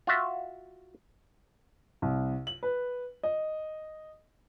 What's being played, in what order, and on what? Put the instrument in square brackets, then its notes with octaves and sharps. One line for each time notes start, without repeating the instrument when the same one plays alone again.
[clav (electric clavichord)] F4 F#4 E5
[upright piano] C2
F#7
B4
D#5